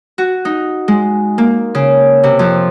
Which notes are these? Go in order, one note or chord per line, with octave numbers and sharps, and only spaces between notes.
F#4
D#4
G#3
A#3
C#3
C3
F2